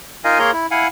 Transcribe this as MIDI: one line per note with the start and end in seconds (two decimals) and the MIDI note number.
0.24 0.39 63
0.24 0.39 65
0.24 0.39 70
0.24 0.39 75
0.24 0.39 77
0.24 0.39 80
0.39 0.51 58
0.39 0.51 68
0.39 0.51 70
0.39 0.51 73
0.39 0.51 82
0.39 0.51 84
0.53 0.67 64
0.71 0.88 64
0.71 0.88 77
0.71 0.88 78
0.71 0.88 80